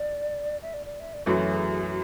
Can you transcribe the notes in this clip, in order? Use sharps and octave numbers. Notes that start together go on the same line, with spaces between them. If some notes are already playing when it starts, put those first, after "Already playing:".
Already playing: D5
E5
D5
D5
E5
D5
F#2 E3 A3 C#5
G#4
G#4
F#4